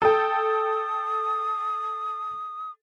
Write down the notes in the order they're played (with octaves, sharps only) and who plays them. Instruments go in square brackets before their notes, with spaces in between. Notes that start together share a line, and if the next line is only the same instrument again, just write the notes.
[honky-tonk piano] A4 G5 [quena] D#6